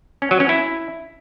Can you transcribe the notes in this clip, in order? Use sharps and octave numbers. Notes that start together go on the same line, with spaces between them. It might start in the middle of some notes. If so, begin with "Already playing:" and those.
C#4
F#3
C#4
E4